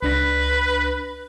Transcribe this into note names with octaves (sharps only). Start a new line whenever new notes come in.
C#2 D4 B4 A#6